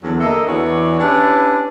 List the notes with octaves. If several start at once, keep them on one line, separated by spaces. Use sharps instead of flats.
E2 D3 F#3
D3 A#3 A4 D#5 E5
E2 E3 D4 F#4 C#5 D5
C#4 D4 E4 G4 B4 C#5